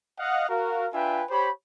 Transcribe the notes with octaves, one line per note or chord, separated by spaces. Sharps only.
D#5 F5 F#5
F#4 A#4 F5
D4 F4 B4 E5 G5 G#5
G4 C5 C#5 B5